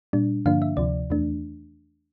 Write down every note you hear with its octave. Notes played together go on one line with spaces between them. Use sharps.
A#2 G3 D4
G2 D3 F3 A#3 D4 F5
E5
D2 C3 F3 D5
E2 E3 A3 D4